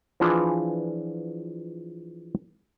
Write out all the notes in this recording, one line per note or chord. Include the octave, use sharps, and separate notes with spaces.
E3 F3 D4 F4 G#4 B4